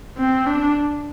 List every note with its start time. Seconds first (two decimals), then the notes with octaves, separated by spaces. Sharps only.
0.18 C4
0.47 D4